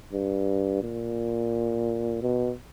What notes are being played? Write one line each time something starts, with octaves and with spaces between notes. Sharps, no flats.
G2
A#2
B2